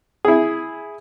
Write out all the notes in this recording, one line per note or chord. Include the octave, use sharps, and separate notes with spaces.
E4 G#4